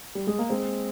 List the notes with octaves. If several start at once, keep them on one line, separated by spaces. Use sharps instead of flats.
G3
G#3
A#3
G#3 C4